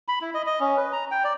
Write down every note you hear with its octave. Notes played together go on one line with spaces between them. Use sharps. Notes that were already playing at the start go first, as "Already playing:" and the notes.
B5
E4
D#5
D#5
C#4
B4
A#5
G5
D5